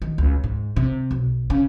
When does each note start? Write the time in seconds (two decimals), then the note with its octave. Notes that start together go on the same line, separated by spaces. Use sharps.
0.02 D#3
0.18 C#2
0.44 G#2
0.76 C3
1.11 B1
1.50 C#3